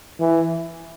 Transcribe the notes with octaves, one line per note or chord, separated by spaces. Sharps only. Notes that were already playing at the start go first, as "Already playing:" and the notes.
E3